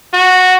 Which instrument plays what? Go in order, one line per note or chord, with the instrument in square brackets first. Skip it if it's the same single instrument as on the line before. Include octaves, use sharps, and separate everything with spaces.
[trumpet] F#4